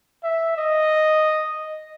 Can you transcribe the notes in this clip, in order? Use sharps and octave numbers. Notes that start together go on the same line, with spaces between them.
E5
D#5